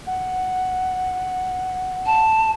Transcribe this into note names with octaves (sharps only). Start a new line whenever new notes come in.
F#5
A5